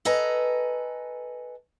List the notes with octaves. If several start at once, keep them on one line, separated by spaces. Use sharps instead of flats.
A4 B4 D#5 G#5 A#5